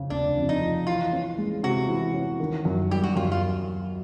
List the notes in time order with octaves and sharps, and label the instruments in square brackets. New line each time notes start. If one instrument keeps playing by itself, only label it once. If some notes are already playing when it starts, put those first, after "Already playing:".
Already playing: [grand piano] F2 C#3
[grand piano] F1 [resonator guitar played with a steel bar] D4
[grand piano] F2
[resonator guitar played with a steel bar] D#4
[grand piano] F3
[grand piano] E3 [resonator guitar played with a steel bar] F4
[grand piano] C#4
G#3
[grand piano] C3 [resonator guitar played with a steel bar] F#4
[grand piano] E3
C#4
D#3
F#2
[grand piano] G3 [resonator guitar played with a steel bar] G4
[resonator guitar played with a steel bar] F#4
[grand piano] F#2 [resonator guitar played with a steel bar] F4
[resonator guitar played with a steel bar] F4